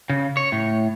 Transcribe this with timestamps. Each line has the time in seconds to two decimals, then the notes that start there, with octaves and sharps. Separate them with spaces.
0.10 C#3
0.37 C#5
0.52 A2